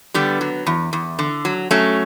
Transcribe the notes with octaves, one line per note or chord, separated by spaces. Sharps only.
D3 G3 B3
F#3
E2
E2
D3
F#3
F#3 A3 C#4